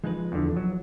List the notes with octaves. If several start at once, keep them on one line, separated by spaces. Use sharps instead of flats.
F3 G#3 D#4 B4
E2 D3
F#3